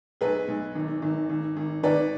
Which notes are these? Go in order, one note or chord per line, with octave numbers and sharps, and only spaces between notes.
B1 G#4 B4
B1
G#1
G#1
G#1
G#1
G#1 B4 D5